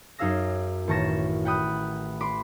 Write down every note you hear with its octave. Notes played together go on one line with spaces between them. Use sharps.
F#2 D#4 G#4 F5 E6 A#6
A1 D#3 A5 C#6 A#6 E7
F#5 G5 B5 D#6 F#6
B5 C6 D6